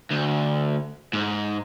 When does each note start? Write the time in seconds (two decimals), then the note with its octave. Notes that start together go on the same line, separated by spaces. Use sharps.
0.11 D2
1.13 G#2